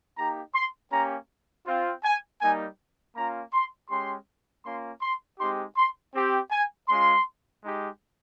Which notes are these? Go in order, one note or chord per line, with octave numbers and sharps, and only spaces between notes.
A#3 D#4 G4 A#5
C6
A#3 C#4 G4 A#5
C4 F4
G#5
G3 A#3 D#4 G#5
A#3 C#4 F4 A#5
C6
G#3 C#4 G4 C6
A#3 C#4 F4 C6
C6
G#3 C4 D#4 G4 C6
C6
C4 G4
G#5
G#3 C#4 F4 C6
G#3 D#4 G4